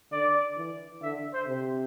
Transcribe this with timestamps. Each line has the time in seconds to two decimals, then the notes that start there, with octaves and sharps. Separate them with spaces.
0.12 D3 D5
0.57 E3
1.02 D3 E5
1.33 C5
1.48 C3